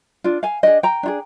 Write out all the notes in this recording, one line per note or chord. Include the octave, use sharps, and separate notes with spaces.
D4 F4
F5 G#5
D4 G#4 D#5 G5
G5 A#5
D4 F4 G#4